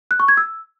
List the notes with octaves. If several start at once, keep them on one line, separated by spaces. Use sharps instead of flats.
F#6
C#6
G#6
E6